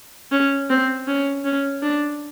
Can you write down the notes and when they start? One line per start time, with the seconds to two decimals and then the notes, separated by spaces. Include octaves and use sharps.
0.32 C#4
0.70 C4
1.08 C#4
1.45 C#4
1.82 D4